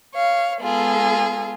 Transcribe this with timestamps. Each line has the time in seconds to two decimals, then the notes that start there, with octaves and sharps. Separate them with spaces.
0.14 C#5 F5
0.60 G#3 B3 F4 G#4 A4